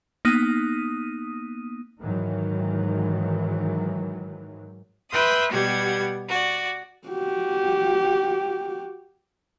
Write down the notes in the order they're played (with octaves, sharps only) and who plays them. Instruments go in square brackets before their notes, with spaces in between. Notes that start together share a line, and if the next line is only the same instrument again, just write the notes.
[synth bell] A#3 B3 D#4 D#6 D#7
[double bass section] G#2 D#3 E3 F#3
[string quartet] B4 E5 G5 C6 D#6
B2 G3 B3 G4 F#5 G#6
F#4 D5
[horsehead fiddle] F#4 G4